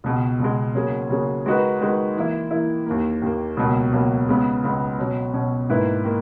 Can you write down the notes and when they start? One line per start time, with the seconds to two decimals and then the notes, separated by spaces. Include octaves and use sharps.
0.04 C#2 B2 G#3
0.39 C#2 B2 G#3
0.74 C#3 F#3 A#3 C#4 G#4
1.10 C#3 F#3 A#3 C#4 G#4
1.46 D#3 G#3 D#4 F#4 B4
1.81 D#3 G#3 D#4 F#4 B4
2.17 E3 A#3 E4
2.51 E3 A#3 E4
2.86 D#2 D#3 A#3
3.22 D#2 D#3 A#3
3.57 C#2 B2 F#3 A#3
3.93 C#2 B2 F#3 A#3
4.29 C#2 C#3 G#3 B3
4.64 C#2 C#3 G#3 B3
4.98 B2 F#3 C#4
5.33 B2 F#3 C#4
5.69 G#2 D#3 A#3 E4 B4
6.05 D#3 A#3